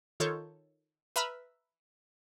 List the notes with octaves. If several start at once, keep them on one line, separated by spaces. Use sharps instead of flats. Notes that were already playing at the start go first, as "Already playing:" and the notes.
D#3 F4 A4 C#5 G6
B4 E5 A#5 B5 F6